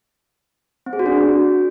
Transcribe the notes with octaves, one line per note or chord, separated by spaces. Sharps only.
C4
G#4
F#4
D4